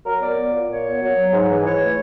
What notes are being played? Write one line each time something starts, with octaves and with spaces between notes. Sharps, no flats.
F#3 A#4
B3 D5
B3
A#2
A#2 C#5
B3
F#3
F#3
G#2
E3
E3 C#5
A3